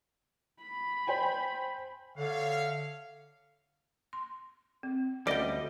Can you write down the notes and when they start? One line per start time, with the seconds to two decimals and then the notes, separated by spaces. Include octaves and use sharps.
0.62 B5
1.07 C5 G5 G#5
2.18 D3 C#5 E5 F5
4.13 C6
4.83 C4
5.27 D2 G3 C#4 D5 D#5 G5